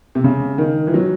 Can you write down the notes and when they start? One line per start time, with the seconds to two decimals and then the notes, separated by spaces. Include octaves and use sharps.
0.15 C3
0.24 C#3
0.58 D#3
0.87 E3
0.94 F#3